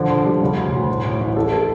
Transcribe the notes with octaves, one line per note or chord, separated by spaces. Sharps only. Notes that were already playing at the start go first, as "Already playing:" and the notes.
Already playing: D3 F3
D3
G3
C#3
D2
D2
A2
A2
A1
A4
A4